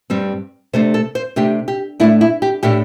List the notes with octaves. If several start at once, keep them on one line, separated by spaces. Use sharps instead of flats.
G2 G3 C4
C3 A3 D4 C5
A4
C5
C3 A3 D4 G4
G4
A2 A3 D4 E4
E4
G4
A2 A3 D4 G4